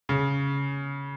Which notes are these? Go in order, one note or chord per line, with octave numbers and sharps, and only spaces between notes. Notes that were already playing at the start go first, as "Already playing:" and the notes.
C#3